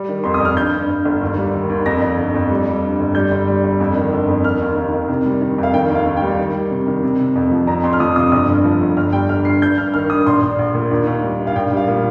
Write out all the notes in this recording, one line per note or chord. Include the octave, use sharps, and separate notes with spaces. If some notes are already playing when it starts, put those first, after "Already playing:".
Already playing: G3
D#3
F2 C6
D#6
F2 F6
G2 G6
G2
G2
G1
D#2
G3
D#3
D#2
F2 A#6
F2
G1
F2
G3
G3
G2
G1
G3 G6
G1
G3
G1
F2
D#3
G1
F2
D#3 F6
D#2
D#2
D#3
C3
G3
D#3
F2
F5
D#3 G5
D#2
F5
D#2
G5
G3
D#3
G3
C3
D#3
C3
C3
F2
F3
F2 A#5
F2 C6
F6
F3 D#6
C3 D#6
G1 D#6
G2
F3
G1
G1 F6
G3 G5
G1 F6
G2 C7
G2 G6
G2 F6
D#3 F6
G2 D#6
A#1 C6
A#1
A#1
A#2
D#2
D#2
G3
D#3
F5
A#1 G5
G3
F5
A#2